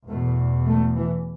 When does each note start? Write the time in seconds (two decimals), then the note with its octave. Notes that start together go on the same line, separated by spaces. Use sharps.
0.08 E2 B2 A3
0.67 A3
0.96 E3